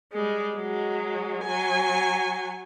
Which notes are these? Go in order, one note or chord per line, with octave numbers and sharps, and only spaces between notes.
G3 G#3
F#3 G#3
F#3 G#5